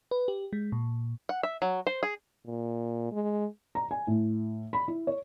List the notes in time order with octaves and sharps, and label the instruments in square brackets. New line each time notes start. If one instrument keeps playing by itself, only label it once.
[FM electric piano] B4
G4
G#3
A#2
[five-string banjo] F#5
E5
F#3
C5
G#4
[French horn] A#2
G#3
[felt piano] A#5
G#5
A2
B5
E4
C#5